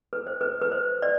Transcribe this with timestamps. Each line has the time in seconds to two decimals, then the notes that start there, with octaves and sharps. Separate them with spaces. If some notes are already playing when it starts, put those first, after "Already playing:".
0.13 B4
0.27 C5
0.41 B4
0.61 B4
0.72 C5
1.02 D5